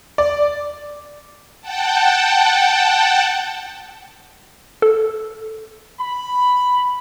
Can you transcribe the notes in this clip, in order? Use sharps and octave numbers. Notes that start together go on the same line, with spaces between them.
D5
F#5 G5 A5
A4
B5